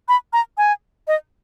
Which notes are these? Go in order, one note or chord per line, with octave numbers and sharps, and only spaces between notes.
B5
A#5
G#5
D#5